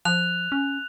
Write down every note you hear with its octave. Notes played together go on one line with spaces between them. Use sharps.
F3 F#6 F7
C#4